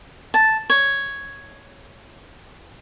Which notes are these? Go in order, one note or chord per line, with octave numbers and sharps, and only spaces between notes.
A5
C#5